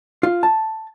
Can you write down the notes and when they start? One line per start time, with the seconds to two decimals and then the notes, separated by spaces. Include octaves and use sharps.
0.23 F4
0.43 A5